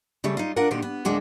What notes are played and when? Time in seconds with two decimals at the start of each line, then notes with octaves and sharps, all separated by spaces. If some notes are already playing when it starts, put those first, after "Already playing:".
0.24 C#3 G3 A3
0.37 D#4 F4
0.56 D4 F4 A#4 F#5
0.71 A#2 D3 D#3 F#4 G4
0.82 B3
1.05 D2 A2 G#3 A#3 D4 F#5